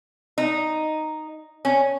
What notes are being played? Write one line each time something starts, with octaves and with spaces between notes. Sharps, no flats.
D#4
C#4